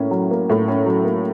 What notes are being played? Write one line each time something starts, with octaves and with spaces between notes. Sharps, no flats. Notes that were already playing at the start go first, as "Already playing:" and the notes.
Already playing: A2 A#3 C#4
F#3
A#3
A2
C#4
F#3
A#3